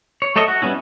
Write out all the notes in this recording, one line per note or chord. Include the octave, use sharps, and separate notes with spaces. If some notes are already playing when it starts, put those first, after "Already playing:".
C#5
A3 A4 C#5 D#5 E5
F#4
G3 B3 C#4 E4